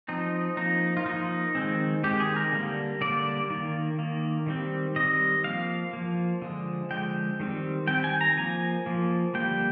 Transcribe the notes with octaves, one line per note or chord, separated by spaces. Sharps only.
F3 C4 D#4
F3 A#3 D#4
F4
F3 A#3 D#4
D#3 G#3 C4
D#3 G#3 C4 G4
G#4
A#4
D3 G3 A#3
D3 G3 A#3 D5
D#3 A#3
D#3 A#3
D#3 G3 C4
D#3 G3 C4 D#5
F3 A#3 F5
F3 A#3
D3 F3 G#3
D3 F3 G#3 G5
D#3 G3 C4
D#3 G3 C4 G5
G#5
A#5
F3 A#3 G#5
F3 A#3
D3 G3 A#3 G5